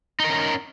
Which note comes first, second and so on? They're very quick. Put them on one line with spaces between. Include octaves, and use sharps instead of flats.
D#4 A#4 C#4